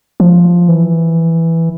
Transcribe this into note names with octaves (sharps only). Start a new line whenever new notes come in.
F3
E3